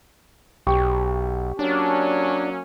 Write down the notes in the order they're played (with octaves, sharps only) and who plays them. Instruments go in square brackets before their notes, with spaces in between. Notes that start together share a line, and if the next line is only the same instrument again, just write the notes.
[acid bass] B1 [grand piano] G4 C#6
[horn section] F#3 A#3 C#4 [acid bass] D4